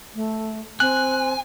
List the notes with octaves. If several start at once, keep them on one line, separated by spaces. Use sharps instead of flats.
A3
C4 G#5 F#6